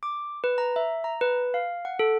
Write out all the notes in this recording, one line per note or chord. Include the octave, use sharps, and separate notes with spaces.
D6
B4
A#5
E5
A#5
B4
F5
F#5
A4